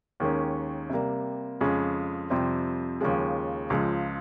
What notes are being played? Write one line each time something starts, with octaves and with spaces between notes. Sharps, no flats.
D#2 D#3 G#3 C#4
C3 G3 A#3
F2 C#3 G#3 C#4
F2 C3 G3 C4
D#2 C#3 F3 G#3
C#2 C#3 F3 G#3